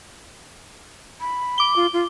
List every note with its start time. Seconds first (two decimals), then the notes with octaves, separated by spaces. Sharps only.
1.20 B5
1.58 D6 G7
1.76 F4
1.93 F4